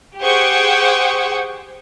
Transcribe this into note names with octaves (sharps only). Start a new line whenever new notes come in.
G4 G#4 C5 F#5 G5 C#6